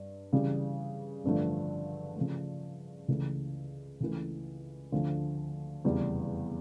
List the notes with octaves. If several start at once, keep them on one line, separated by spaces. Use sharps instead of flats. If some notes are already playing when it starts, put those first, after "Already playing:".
Already playing: G2
C#3 E3 G3
A1 G2 D3 F3 A3
C#3 F3 A3
C#2 C#3 E3 A3
C#2 C#3 E3 A3
D2 D3 F3 A3
F1 E2 C#3 E3 G3